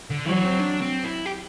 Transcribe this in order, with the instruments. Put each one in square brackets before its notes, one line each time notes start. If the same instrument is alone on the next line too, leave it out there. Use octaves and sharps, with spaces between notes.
[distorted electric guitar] D3
[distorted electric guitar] E3 [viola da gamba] F#3
[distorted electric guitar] C4
D4
C4
E4
G4